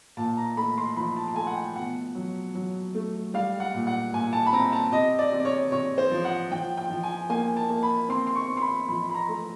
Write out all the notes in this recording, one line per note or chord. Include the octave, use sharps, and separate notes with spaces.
A#2 A5
A#5
A3 B5
C6
F3 B5
A5
A5
A3 G#5
F#5
G5
B2 F#5
F#3
F#3
A3
G3 F5
F#5
A#2
F#5
A#2 G#5
A5
B5
C4 A#5
A5
C3 D#5
D5
C3
D5
C#5
C3 C#5
C5
F3
F#5
F3 G5
G5
F3
G#5
A#3 G#5
A5
A#3
B5
C4 C6
C6
C#6
C4
C6
B5
F3 B5
B5
A#5
A3